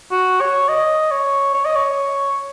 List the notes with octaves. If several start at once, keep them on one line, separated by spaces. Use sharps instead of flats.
F#4
C#5
D#5
C#5
C#5
D#5
C#5